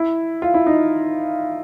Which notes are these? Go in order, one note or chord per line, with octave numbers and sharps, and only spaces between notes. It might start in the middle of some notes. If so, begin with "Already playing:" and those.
Already playing: E4
F4
E4
D#4